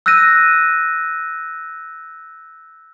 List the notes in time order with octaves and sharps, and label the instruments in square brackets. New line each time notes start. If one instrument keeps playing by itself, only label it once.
[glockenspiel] E6 F#6 G6 A#6 D#7